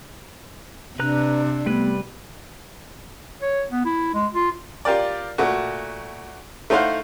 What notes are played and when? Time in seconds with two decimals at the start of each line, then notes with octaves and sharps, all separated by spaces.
0.99 C3 D4 B4 A#5 F#6
1.66 G3 A3 B3 B4
3.42 C#5
3.71 B3
3.85 E4
4.14 G#3
4.34 F4
4.85 F4 G4 A#4 D5
5.38 A#2 A3 F#4
6.70 A3 D#4 E4 C5 F5 F#5